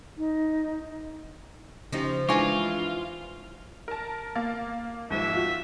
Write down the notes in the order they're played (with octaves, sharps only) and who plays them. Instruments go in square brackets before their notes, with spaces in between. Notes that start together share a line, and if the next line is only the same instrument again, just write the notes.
[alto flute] D#4
[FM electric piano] C#3 G4 [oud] F3 C#4 D#4
[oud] E3 D#4 [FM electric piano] G#3 D4 [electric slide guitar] F4 [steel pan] G#5 C#6 D6
[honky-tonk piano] A#4 A5
A#3 F5 A6
[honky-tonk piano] D#2 G#2 F3 [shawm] E5
[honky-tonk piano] F4 F#4